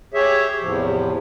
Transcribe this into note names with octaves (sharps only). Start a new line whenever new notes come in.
G4 G#4 C#5 E5
E2 A2 C3 F3